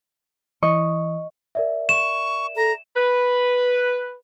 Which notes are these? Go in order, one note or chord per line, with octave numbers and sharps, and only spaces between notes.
E3 D#5 C#6
A#4 D5 E5
C#6 E7
A4 A#5
B4